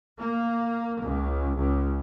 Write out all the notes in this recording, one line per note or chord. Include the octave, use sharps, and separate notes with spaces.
A#3
C#2
C#2